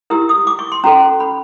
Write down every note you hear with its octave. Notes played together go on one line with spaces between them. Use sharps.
E4 G4 A#4 E6
D#6
D6
C#6
C6
C#4 F#4 A4 A#5
B5